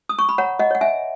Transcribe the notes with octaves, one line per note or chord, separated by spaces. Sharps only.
D#6
C#6
B5
C#5 F#5 A#5
D#5 F#5
C#5 F#5
E5 G#5